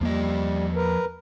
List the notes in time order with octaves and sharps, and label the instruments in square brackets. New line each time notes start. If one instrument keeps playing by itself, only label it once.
[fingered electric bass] E2 A#3 [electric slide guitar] F3 D#5 [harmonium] G3
[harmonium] A#4 B4